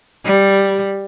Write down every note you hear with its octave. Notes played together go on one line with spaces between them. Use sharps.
G3